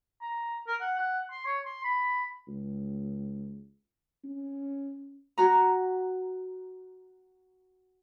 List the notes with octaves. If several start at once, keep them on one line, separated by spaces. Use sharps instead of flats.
A#5
A#4
F#5
F#5
C6
C#5
C6
B5
C#2
C#4
F#4 A#5